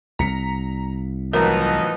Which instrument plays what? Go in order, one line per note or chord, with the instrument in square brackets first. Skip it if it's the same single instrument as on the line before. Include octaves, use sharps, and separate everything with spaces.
[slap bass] C2 [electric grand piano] A#5 B6 C#7
[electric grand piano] A1 F#3 [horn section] F3 B3 D#4 [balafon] A#4 A#5